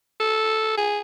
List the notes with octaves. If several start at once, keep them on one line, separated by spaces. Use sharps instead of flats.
A4
G#4